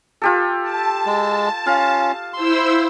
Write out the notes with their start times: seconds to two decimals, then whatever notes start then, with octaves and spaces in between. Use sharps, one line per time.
0.22 F4 G4 A4
0.62 A5
1.06 G#3
1.66 C#4 F4 F5
2.33 E4 C5 C6 E6